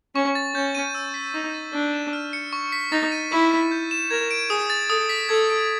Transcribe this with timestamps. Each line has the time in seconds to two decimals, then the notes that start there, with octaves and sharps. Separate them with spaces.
0.15 C#4 C#6
0.35 A6
0.55 C#4 G6
0.75 D#7
0.95 E6
1.14 B6
1.34 D#4 C#6
1.54 A6
1.73 D4 A6
1.93 E7
2.13 F6
2.33 C#7
2.53 C#6
2.72 B6
2.92 D#4 A6
3.12 D#7
3.32 E4 C#6
3.52 B6
3.71 G6
3.91 E7
4.10 A#4 G#6
4.31 D7
4.50 G#4 D#6
4.70 A6
4.90 A4 D#6
5.09 B6
5.29 A4 G#6
5.50 D7